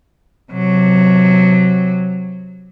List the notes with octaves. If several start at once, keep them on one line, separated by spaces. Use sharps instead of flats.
C3 F#3